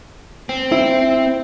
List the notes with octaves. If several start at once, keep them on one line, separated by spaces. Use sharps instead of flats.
C4
E4